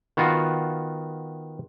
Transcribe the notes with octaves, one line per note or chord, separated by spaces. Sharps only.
D#3 B3 F4 F#4